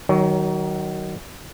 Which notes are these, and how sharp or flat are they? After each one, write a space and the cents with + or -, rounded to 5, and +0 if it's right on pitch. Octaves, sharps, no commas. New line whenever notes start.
D#3 +0 F#3 +30 C#5 +10